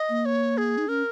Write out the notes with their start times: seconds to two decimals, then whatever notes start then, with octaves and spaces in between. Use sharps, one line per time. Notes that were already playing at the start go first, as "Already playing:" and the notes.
Already playing: D#5
0.09 A#3
0.25 C#5
0.58 G#4
0.78 D#4
0.88 C#4 A#4